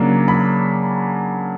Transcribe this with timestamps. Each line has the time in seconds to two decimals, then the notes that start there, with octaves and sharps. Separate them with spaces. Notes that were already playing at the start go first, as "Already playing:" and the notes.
Already playing: C#3 F#3 A#3 D4
0.28 B5